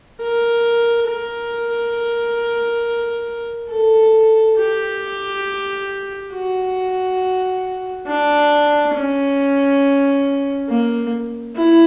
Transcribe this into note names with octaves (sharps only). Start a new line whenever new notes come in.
A#4
A#4
A4
G4
F#4
D4
C#4
A#3
E4